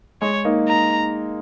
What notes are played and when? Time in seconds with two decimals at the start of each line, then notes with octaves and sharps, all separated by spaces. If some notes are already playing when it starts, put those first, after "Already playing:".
0.21 G#3 C#5
0.45 A#3 D#4
0.69 A#5